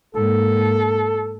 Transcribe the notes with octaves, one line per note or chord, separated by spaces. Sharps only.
G#2 A#3 A4